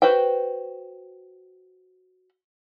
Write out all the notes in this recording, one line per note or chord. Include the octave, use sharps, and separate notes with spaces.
F#4 B4 C5 G5